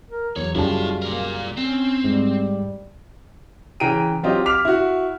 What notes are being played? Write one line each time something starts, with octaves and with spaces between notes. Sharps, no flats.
A#4
E2 F#3 C#5
F#2 C#3 G3 E4 F4 A5
A#3 A#4 D5
C4 C#4
G#2 G3
C#3 E3 G5 A#5 D7 D#7
F#3 C4 F4 G4 D#5
D6 F6 B6 F7
E4 F#4